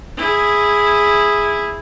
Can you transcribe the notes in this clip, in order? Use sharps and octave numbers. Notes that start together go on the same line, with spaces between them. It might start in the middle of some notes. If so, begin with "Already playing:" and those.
E4 G#4